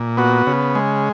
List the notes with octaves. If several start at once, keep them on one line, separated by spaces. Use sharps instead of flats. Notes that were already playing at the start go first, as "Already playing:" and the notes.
Already playing: A#2
B3 F#4
C#3
G#3